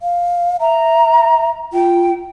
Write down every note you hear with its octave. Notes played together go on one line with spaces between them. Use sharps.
F5
E5 A#5
F4 G5